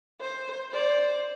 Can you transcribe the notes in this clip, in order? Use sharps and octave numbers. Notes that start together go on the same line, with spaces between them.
C5
C5 D5